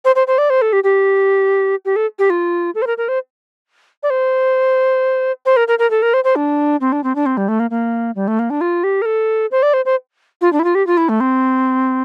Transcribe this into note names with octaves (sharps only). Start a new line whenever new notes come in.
C5
C5
C5
D5
C5
A4
G4
G4
G4
A4
G4
F4
A4
C5
A#4
A#4
C5
D5
C5
C5
A#4
A#4
A#4
A4
A#4
C5
C5
D4
C4
D4
C4
D4
C4
G3
A3
A#3
A#3
G3
A3
A#3
D4
F4
G4
A#4
A4
C5
D5
C5
C5
F4
D4
E4
F4
G4
F4
E4
A3
C4